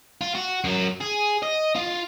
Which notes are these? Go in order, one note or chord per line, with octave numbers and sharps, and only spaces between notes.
F4
F#4
F#2 F#3
G#4
D#5
F4